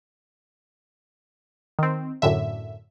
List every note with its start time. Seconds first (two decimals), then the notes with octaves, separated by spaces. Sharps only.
1.79 D#3 C4
2.22 F#2 A2 D3 E5